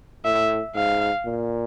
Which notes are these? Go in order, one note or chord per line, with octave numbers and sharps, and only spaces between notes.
A2 E5
G#2 F5
A#2